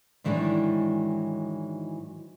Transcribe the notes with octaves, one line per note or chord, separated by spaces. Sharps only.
G#2 D#3 E3 F#3 G#3 D4